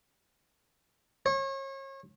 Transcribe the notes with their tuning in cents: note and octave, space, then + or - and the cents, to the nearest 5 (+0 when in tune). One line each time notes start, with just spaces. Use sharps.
C#5 -35